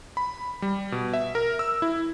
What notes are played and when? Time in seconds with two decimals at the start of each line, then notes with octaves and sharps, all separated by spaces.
0.17 B5
0.62 G3
0.92 B2
1.13 E5
1.35 A#4
1.59 E6
1.82 E4